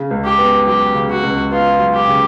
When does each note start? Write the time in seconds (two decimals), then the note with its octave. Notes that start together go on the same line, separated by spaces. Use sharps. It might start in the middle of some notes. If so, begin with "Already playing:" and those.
Already playing: C#3
0.11 C#2
0.25 G4
0.38 B3
0.66 F#3 G4
0.94 C#3
1.09 F#4
1.23 C#2
1.51 B3 F4
1.79 F#3
1.94 G4
2.08 C#3